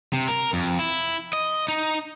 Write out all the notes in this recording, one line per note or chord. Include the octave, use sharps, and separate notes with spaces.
C3
A#4
F2
E4
D#5
D#4